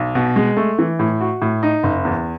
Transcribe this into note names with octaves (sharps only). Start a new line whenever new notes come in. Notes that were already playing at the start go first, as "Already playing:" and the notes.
Already playing: B1
B2
G#3
A3
E3
A2
F#4
A2
D#4
F#1
E2